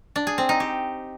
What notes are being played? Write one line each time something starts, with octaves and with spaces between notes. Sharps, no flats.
D4
G#4
C4
D#4
G4